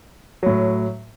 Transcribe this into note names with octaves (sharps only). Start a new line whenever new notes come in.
A2 F#3